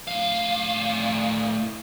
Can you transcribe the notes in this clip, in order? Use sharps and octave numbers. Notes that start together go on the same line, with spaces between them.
A2 F5